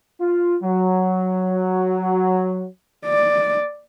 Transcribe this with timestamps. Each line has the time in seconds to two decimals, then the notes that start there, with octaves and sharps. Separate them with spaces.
0.20 F4
0.63 F#3
3.06 D5